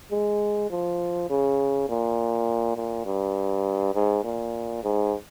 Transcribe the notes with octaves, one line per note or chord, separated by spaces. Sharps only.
G#3
F3
C#3
A#2
A#2
G2
G#2
A#2
G#2